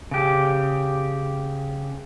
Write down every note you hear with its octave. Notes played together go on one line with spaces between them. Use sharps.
C#3 G4